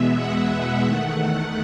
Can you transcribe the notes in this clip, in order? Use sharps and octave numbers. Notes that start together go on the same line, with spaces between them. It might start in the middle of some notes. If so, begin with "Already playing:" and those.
Already playing: E2 B2 G#3 B3 E5
F#5
E2 D#3 A3